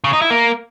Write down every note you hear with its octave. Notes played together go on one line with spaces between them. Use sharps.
C#3
D#4
E4
A#3